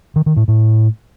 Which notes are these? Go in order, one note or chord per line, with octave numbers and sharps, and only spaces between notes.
D#3
D#3
A2
A2